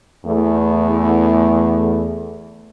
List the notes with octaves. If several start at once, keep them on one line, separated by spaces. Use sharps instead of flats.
E2 A3